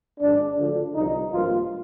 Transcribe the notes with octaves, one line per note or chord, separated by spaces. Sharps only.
G#1 G#2 F3 G#3 D4
D2 D3 F3
C2 C3 F3 D#4
G#1 G2 F3 A#3 F4